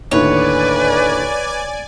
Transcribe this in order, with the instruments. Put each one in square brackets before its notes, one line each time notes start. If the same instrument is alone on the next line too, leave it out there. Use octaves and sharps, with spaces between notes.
[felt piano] D#2 A2 D3 [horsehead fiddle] B4 [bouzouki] C#5 [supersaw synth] D5 G#5